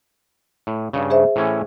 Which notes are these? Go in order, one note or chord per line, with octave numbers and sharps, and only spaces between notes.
A2
G2 C#3
G#4 C5 E5
A2 E3 C#4